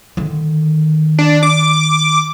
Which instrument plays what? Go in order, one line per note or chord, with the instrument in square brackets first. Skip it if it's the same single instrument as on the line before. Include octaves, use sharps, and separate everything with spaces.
[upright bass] D3 D#3
[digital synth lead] D4
D6